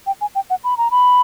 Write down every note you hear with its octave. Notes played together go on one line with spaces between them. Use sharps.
G5
G#5
G5
F#5
B5
A#5
B5